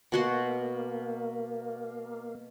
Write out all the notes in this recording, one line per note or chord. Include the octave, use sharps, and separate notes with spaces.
B2 A#3 F#4 C6